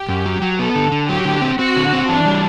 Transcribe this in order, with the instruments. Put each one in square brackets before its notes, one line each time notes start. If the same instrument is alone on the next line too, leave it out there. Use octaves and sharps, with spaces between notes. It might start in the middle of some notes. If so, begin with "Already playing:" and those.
Already playing: [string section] G4
[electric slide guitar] F#2
F#3
F#3
[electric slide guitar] B3 [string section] A4
[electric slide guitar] D3
D3
[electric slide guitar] F#3 [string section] G4
[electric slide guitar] D3
C4
[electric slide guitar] C4 [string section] F#4
[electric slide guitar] D3
C4
[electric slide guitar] E3 [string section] D4
[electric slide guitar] G3